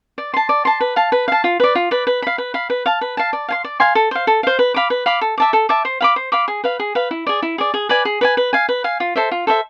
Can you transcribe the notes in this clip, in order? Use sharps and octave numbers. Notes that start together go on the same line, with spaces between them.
D5
A5 C6
D5
A5 C6
B4
F5 A5
B4
F5 A5
F4
B4 D5
F4
B4 D5
B4
F5 B5
B4
F5 B5
B4
F5 A5
B4
F5 A5
D5
F5 G#5 C6
D5
F5 G#5 C6
A4
C5 F5
A4
C5 F5
B4
F5 B5 D6
B4
F5 B5 D6
A4
E5 A5 D6
A4
E5 A5 D6
C5
F5 B5 D6
C5
F5 B5 D6
G#4
B4 F5
G#4
B4 F5
E4
G#4 D5
E4
G#4 D5
G#4
B4 D5 G#5
G#4
B4 D5 G#5
B4
F5 G#5
B4
F5 G#5
F4
A4 C5 E5
F4
A4 C5 E5